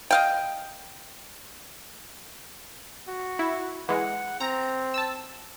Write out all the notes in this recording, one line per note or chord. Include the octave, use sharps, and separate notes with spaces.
D#5 F5 G5
F#4
E4
E3 G#3 F#5
C4 A#5
A5 E6